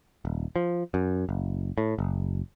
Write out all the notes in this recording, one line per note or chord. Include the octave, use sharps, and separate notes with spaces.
D#1
F3
F#2
F#1
A2
F#1